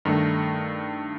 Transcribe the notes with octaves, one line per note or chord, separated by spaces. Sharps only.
G2 D#3 A3 D#4